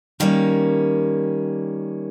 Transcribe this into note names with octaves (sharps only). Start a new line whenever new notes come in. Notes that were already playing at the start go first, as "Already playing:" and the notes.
D#3 G3 A#3 C#4